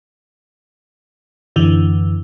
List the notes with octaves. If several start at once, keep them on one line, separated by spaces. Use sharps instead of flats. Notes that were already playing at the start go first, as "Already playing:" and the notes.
F#2 D3 E3